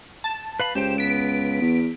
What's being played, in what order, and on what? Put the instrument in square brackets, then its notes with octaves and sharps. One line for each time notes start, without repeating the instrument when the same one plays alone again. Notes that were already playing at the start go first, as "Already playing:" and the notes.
[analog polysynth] A5
[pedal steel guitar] B4 F5 B5
[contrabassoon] C#2 [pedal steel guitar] G4 C5 G5 [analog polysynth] E7
[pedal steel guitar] B3 [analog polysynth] B6 D7
[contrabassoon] E2